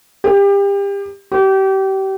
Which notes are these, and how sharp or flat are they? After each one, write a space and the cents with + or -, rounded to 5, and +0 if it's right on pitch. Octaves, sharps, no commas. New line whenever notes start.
G4 +30
G4 -30